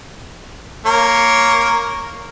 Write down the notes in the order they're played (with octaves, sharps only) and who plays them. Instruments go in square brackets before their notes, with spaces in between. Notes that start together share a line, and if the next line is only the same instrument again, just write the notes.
[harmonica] A#3 A#4 C#5